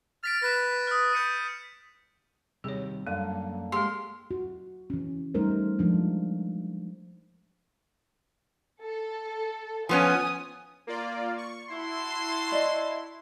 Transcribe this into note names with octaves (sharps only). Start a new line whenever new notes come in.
F6 A6 B6 D7
B4 A#6 B6 E7
D#6 F6
G6 C#7 D#7
D#2 C3 G3 G#4 C#5
F#2 D3 G3 A#3
G#3 G4 G#4 C6
F#4
E3 C#4
G3 A3 D#4 A#4 C5
F3 G#3 D4
A4
F3 B3 C#4 G#5 D#6
A#3 F4 D5
C#6
E4 F#4 A5 C6
D5 D#5